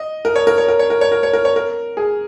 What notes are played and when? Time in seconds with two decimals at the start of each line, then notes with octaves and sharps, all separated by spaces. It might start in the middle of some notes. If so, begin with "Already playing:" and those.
Already playing: D#5
0.25 A#4
0.36 C#5
0.47 A#4
0.58 C#5
0.68 A#4
0.79 C#5
0.90 A#4
1.01 C#5
1.12 A#4
1.23 C#5
1.33 A#4
1.45 C#5
1.56 A#4
1.97 G#4